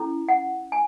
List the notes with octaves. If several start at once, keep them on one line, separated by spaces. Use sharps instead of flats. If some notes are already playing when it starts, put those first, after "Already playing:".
Already playing: C#4 E4 A4
F#5
G#5